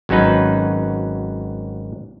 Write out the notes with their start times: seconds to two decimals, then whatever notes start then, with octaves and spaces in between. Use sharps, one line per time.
0.09 G#1 F#3 C#4 D#4 B4